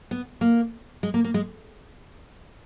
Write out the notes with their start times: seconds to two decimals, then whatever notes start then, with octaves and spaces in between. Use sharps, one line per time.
0.11 B3
0.41 A#3
1.03 G#3
1.14 A#3
1.24 A#3
1.34 G#3